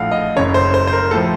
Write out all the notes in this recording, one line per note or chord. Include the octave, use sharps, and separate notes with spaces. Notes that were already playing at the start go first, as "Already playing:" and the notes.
Already playing: A#1 A2 F3 F5 F#5
D#5
F#1 F#2 C#3 C#5
C5
C5
C5
A#4
A2 F3 A4